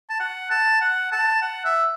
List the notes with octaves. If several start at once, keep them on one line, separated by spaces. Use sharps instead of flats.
A5
F#5
A5
F#5
A5
F#5
E5